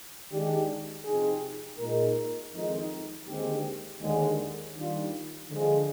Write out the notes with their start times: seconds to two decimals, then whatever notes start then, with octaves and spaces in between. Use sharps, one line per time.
0.31 D#3 G#3 D4 G4
1.05 C3 F3 C4 D#4 G#4
1.79 A#2 G#3 D#4 A#4
2.53 F2 D#3 G#3 D#4
3.27 D#2 D3 G#3 C4 G4
4.01 D#2 D3 G#3
4.75 D#3 G3 A#3 D4 F4
5.49 D3 F3 G#3